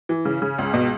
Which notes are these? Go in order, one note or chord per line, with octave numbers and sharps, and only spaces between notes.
E3
C#3
C#3
C#2
B2